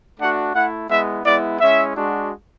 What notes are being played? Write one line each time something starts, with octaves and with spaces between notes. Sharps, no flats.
A3 D4 F#4 F#5
A3 E4 F#5
G#3 B3 E4 E5
G#3 B3 E4 D5
G#3 C#4 E4 E5
G#3 D4 F#4